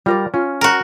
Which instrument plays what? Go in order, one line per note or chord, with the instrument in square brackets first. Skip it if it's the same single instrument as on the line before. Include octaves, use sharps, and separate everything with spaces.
[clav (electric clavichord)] G3 [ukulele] F4 A#4 D5
[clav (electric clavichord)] C#4 [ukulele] F4
[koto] F#4 A#4